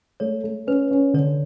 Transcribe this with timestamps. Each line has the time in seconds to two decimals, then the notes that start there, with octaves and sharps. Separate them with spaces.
0.20 A3 C#5
0.44 A3
0.67 C#4 B4
0.91 C#4
1.13 D3 C#5